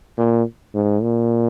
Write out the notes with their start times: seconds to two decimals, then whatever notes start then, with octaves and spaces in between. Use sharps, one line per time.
0.17 A#2
0.74 G#2
1.02 A#2